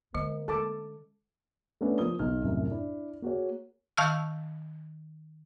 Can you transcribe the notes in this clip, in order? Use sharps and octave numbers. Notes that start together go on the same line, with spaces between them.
D3 G#3 A#3 B3 D#5
G#3 C#4 A4 A5 D6
A3 B3 C#4 D4
F3 A#3 D#6 G7
B1 D#4 F6
C2 F#2 A2
D4 E4
A#3 F#4 G#4 C#5
D#3 F5 A5 C#6 E6 F6